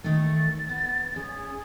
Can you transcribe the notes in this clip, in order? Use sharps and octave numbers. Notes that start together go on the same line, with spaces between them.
D#3 A3 A6
B3
C#4 G#4